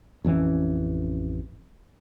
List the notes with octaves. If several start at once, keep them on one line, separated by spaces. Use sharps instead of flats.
A1 F2 E3 C#4